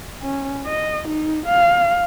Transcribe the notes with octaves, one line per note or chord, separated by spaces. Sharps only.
C#4
D#5
D#4
F5